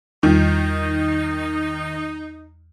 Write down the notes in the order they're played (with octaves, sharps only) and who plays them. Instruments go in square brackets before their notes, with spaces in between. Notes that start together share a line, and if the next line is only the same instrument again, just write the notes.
[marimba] E2 G3 F4 [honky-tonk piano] D#3 [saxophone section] D#4